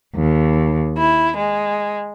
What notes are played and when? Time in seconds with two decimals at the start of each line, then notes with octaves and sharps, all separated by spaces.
0.15 D#2
0.96 E4
1.37 G#3